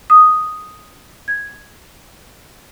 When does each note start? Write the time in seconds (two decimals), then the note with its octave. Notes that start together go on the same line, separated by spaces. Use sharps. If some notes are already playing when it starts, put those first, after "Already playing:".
0.10 D#6
1.28 G#6